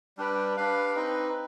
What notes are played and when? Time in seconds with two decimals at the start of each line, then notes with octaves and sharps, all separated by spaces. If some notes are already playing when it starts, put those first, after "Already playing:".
0.17 G3 D4 G4 B4
0.57 D4 G4 B4 F5
0.95 C4 D#4 B4